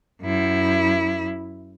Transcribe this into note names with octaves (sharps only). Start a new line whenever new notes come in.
F#2 E4